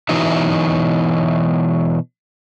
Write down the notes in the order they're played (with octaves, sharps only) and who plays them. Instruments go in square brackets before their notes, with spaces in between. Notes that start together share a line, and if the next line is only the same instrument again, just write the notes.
[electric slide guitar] B2 E3 F#3 D#4 E5